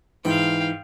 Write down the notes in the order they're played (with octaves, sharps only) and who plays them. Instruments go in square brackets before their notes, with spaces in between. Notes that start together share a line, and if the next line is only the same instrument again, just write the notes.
[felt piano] G#2 [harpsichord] E3 [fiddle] F5 G5